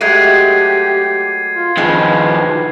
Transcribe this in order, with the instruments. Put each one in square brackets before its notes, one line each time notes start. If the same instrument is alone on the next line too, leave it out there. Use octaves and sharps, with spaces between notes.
[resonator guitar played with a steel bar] F#3 G#3 A3 [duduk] G4 [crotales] G#6 C7 D#7
[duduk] F4
[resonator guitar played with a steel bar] F2 G#3 [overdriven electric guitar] D#3 F3 [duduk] B4